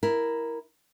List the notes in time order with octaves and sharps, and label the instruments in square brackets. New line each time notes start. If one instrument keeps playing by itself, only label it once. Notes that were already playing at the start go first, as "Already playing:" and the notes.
[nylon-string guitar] E4 A#4